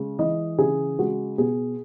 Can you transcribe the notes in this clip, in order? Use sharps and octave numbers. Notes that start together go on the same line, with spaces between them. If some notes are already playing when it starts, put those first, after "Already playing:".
Already playing: C#3 G#3
E3 D#5
C#3 G#4
G#3 F#4
B2 G#4